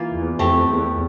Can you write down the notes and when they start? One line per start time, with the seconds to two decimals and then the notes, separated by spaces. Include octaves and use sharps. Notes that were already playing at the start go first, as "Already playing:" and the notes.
Already playing: E3 A#3 F4
0.11 E2
0.39 F2 A3 C4 G4
0.67 E2